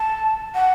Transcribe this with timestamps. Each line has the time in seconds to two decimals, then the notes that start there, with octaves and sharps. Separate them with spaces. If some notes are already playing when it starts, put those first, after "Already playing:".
Already playing: A5
0.55 F#5